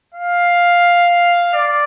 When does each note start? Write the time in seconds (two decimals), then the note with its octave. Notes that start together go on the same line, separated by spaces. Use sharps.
0.14 F5
1.54 D5